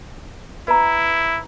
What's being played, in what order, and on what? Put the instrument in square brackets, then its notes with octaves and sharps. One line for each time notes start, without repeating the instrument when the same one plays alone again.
[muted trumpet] E4 [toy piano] B4 A#5